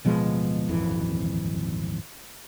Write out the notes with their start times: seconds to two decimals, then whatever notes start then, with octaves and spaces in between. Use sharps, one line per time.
0.05 D1 B2 F3 G#3
0.69 D#1 G#1 F2 E3